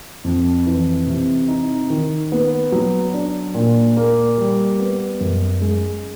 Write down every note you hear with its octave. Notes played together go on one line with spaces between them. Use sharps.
F2
E3
C3
D#4
D#3
B3
F#3
D4
A#2
A#3
G3
B3
F#2
G#3